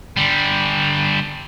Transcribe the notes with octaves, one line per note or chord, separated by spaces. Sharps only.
D3 G3